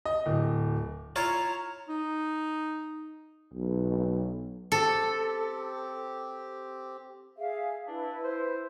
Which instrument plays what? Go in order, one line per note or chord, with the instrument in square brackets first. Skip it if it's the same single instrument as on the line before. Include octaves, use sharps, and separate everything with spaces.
[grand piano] D#5
D1
[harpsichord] E4 F4 [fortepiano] C#5 [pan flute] A#5
[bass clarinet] D#4
[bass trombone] B1
[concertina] C4 G4 [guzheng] A4
[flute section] G#4 E5 F5
[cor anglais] D4 [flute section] E4 B4
[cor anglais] C5